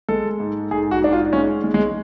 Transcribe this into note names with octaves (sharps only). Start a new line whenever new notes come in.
G#3 A4
G#2
G#2 G#4
F#4
G#2 D4
F4
G#3 C#4
G#3
G#3